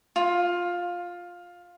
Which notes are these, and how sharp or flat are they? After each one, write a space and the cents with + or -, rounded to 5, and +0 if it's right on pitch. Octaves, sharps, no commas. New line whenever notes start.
F4 +10